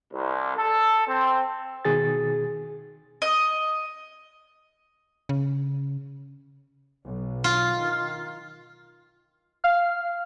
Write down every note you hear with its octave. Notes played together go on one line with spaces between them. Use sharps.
C2
A4
C4
B2 D#3 G#4 A6
D#5
C#3
B1
F4
D#3
F5 F6